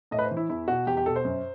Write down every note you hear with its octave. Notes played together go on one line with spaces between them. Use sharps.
A2 D#5
B4
C5
E3
E4
E2 E4
B2 F#4
E2 G4
G4
B2 A4
C5
F#2